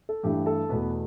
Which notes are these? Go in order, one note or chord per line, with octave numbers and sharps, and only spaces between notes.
A4
G2 E3 A3 G4 G5
A4 A5
E2 B2 A3 B3 B4